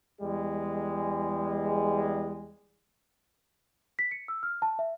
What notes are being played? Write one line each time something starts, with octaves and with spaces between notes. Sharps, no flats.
E2 G3 G#3
B6
C#7
E6
F6
A5
E5